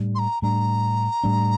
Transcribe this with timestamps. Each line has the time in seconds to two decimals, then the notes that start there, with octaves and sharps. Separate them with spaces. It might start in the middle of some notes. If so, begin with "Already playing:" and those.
Already playing: A2 G3 D4
0.15 C6
0.19 A#5
0.42 A2 G3 D4 A#5
1.24 A2 G3 D4